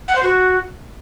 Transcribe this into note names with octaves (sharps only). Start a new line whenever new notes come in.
F#5
C5
F#4